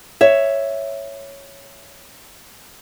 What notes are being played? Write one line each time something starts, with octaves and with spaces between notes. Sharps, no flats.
C#5 E5